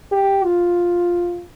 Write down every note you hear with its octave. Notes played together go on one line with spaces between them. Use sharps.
G4
F4